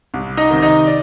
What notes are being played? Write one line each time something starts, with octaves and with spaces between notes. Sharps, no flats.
C2
D#4 D#5
C3 D#3
D#4 D#5
D5